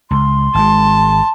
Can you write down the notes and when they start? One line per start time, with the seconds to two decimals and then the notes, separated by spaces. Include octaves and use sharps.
0.11 C#2 C6
0.55 G#1 G#3 A5